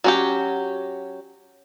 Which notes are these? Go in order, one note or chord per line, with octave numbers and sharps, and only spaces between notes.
F#3 C#4 G4